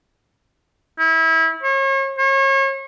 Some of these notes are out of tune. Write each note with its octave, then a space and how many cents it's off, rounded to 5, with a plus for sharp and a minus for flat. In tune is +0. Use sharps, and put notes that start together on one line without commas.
E4 -25
C#5 -40
C#5 -35